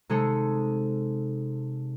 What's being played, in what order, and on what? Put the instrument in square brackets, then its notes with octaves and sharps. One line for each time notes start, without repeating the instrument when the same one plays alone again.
[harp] C3 G#3 D#4 G#4 A4 C#7